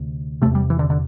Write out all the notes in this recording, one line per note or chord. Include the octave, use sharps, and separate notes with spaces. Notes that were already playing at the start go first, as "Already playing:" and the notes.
Already playing: D2 C3
E2 C3 A3
G3
E3
D3
D3